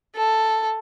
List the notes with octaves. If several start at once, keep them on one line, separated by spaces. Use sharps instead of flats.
A4